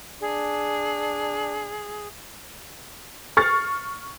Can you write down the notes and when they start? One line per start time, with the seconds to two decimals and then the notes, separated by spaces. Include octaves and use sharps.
0.21 D4 G#4
3.37 C#6 F6 A6 C7